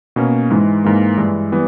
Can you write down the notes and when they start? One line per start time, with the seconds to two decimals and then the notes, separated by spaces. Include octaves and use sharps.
0.16 B2 A#3 C#4
0.50 G#2 E3 G#3
0.84 G#2 E3 A#3
1.17 G2 E3 G#3
1.52 E3 G3 B3